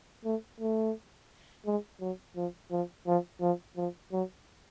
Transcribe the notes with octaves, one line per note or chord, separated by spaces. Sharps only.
A3
A3
G#3
F#3
F3
F3
F3
F3
F3
F#3